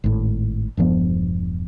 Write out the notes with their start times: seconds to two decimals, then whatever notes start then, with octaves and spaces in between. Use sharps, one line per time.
0.04 G#1 A2
0.77 E1 G2 F3 B3